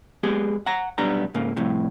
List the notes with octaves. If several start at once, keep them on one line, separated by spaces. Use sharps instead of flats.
G#3 B3 G4 G#4
F#5 A#5
B1 G3 B3 D4 A#5
G#2 C#3 A#3
C2 F2 A2 C3